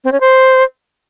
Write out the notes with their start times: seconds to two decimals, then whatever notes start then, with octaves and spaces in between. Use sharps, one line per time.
0.04 C4
0.12 C#4
0.20 C5